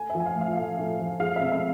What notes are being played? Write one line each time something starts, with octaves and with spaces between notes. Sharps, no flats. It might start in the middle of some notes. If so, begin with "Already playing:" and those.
Already playing: A3 G#5
E5
F3
G#5
F5
A2
F5
A2 F5
A3
F3
G#3 F5
C3 E5
E5